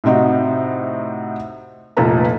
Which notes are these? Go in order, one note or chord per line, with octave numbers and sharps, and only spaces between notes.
A2 C3 C4 D#4 F#4
F1 A#2 A4 B4 A#5